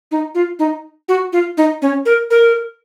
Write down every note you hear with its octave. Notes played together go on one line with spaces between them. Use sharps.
D#4
F4
D#4
F#4
F4
D#4
C#4
A#4
A#4